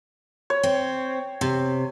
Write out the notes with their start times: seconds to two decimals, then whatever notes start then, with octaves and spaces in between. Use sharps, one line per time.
0.50 C#5
0.63 C4
1.41 C3